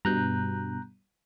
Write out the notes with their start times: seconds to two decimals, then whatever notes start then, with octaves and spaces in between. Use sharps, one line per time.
0.05 G2 B2 A#5 F#6 G6